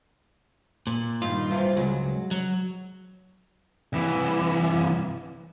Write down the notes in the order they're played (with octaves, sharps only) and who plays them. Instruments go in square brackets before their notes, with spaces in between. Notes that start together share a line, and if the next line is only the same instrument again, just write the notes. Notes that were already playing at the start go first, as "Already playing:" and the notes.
[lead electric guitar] A#2
[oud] G2 D#3 [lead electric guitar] F4
[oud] C3 E3
[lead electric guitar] C#2 [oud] F#3 G#3
[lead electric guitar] F#3
C2 E3